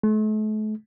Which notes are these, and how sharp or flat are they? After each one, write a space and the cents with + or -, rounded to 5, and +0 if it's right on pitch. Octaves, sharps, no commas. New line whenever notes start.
A3 -40